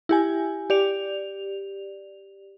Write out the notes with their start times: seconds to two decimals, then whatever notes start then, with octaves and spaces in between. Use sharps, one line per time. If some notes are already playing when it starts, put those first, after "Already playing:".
0.09 E4 G4 G#5
0.70 G4 D5 F7